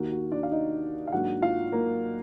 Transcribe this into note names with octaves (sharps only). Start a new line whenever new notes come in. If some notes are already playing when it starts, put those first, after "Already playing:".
Already playing: D#2 D#3 A#3 F#4
F#4
D4 D5
F5
D#4 D#5
F5
G#2 D#3 F#3 A#3 D4 F#4 F#5
F4 F5
A#3 A#4